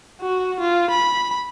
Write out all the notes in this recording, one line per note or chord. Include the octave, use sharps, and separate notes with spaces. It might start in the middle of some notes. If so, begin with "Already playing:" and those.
F#4
F4
B5